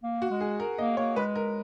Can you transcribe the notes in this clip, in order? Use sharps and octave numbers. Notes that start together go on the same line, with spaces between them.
A#3
F#4
G#3
G#4
A#4
A#3 D#5
A#3 C#5
G#3 B4
A#4